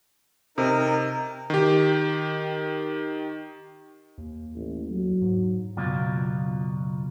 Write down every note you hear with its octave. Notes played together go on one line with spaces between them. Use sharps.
C3 D#4 A#4
D#3 G4
D#2
A1
F#3
G#2
C#2 F#2 B2 F4 D5